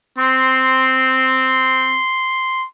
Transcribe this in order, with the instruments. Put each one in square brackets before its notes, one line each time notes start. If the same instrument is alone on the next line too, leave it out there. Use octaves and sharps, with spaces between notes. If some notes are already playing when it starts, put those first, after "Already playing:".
[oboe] C4 [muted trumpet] C6